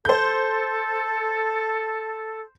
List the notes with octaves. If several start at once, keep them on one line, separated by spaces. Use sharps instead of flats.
A4 C5 G6